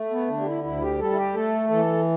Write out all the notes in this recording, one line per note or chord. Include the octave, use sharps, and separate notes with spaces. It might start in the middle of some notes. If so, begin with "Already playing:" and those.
Already playing: A3
B3
D3 D4
G4
E4
D2 E4
G4
G3 A4
E4
G4
A3 A4
E3 A4